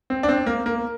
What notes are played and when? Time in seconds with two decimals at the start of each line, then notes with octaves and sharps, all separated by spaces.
0.10 C4
0.23 D4
0.29 C4
0.47 A#3
0.66 A#3